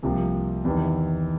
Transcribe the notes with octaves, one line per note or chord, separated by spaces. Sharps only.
C2 C3 F3 A#3
E2 C3 D#3